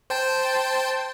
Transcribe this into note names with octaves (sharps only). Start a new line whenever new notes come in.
C5 G5 A5